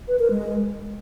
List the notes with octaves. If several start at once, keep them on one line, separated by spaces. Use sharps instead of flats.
B4
A#4
G#3